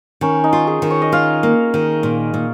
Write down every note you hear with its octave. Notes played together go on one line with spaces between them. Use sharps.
D#3 C#4
D#4
F4
G#4
D#3
C#5
D#5
F4 F5
A#3
D#3
A#2
A#2